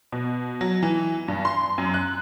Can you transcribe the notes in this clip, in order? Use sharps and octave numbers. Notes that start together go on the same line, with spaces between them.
B2
F#3
E3
G2
C6
F#2
F#6